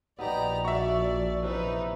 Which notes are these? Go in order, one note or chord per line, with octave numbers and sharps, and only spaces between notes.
A#1 B3 D#4 G4 D5 A#5
F#4 D5 E5 C#6
C3 E3 D#4 B4